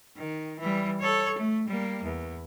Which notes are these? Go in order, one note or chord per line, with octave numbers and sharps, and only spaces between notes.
D#3
E3 G3
A4 C#5
A3
G3 A#3
E2